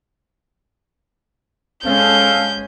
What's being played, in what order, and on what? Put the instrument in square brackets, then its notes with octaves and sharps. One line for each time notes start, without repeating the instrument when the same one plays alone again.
[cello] G#3 [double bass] C#4 [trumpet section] A4 F5 [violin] G6